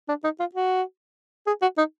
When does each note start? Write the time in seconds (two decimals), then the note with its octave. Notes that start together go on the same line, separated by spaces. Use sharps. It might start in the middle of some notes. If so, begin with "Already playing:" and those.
0.09 D4
0.24 D#4
0.40 F4
0.55 F#4
1.47 G#4
1.62 F#4
1.78 D#4